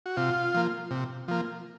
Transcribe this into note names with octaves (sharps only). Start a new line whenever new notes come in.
F#4
C3 F4
F3 A#3
C3
F3 A#3